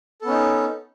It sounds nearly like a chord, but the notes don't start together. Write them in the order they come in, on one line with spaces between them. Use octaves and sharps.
A4 B3 C#4 D#4